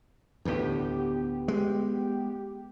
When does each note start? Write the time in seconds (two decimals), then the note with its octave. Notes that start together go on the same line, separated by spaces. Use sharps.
0.45 D2 A2 B3 G4
1.48 G#3